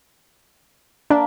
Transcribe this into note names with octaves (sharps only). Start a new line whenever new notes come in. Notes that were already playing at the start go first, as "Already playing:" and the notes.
A#3 D4 E5 A5